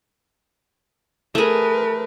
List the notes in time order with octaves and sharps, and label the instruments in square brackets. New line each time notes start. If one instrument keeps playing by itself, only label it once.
[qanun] A3 G#4 [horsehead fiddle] A#4 B4